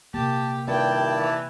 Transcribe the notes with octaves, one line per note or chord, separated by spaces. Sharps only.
C3 A#3 G4 A5
G2 A#2 D#3 C4 E4 D5 G5 A5
E3